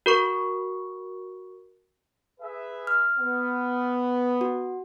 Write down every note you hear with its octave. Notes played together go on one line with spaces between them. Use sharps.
F#4 A#4 C#6
G#4 B4 E5
F6
B3
F#4